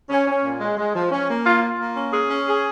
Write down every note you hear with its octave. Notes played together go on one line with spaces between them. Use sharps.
C#4
C#4
A#2
G#3
G#3
F3
C#4
A#3
F4
F4
A#3
C#4
G#4
C#4
G#4